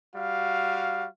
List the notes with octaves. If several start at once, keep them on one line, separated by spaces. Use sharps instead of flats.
G3 F#4 F5